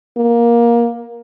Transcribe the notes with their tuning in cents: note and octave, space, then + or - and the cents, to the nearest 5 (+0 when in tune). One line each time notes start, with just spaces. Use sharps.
A#3 +15